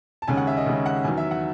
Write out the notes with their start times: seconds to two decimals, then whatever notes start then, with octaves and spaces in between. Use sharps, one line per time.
0.22 A5
0.27 D#2 C#3 G#3 C#4 G#5
0.37 F#5
0.47 E5
0.57 D#5
0.66 D#2 C#3 G#3 C#4
0.86 F#5
1.05 E2 D#3 F#3 G#5
1.17 E5
1.31 F#5